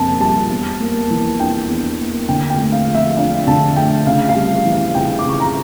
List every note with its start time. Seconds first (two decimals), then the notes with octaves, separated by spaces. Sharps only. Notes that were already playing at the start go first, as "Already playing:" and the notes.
Already playing: F2 C#3 G3 A#3 A5
0.20 G3 A5
0.50 E2
0.80 A#3
1.10 E3
1.39 D4 G5
1.68 E2
1.99 A#3
2.28 D3 G5
2.50 G5
2.57 A3
2.72 F5
2.87 F3
2.94 E5
3.16 D4 F5
3.47 D3 A5
3.76 A3 G5
4.06 C#3 F5
4.29 F5
4.35 G3
4.65 E3
4.72 F5
4.95 C#3 G5
5.19 D6
5.25 C#3 C#6
5.40 A#5